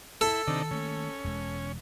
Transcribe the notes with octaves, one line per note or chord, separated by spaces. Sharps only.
E4 A4
C3 D#3 D4 D#4
D#3 A3 A#3 C#4
E1 E2 G#3